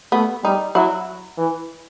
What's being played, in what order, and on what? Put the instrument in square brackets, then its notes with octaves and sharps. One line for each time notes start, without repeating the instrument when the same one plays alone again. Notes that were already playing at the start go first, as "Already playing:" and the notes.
[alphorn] A3 [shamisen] B3
[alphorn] G3 [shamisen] D#4
[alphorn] F#3 [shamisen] E4
[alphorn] E3